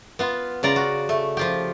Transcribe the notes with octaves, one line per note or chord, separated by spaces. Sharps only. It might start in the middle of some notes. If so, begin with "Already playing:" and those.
B3 F4
C#3 F4 D5 A#5
F#4
A3
F3 F4 G4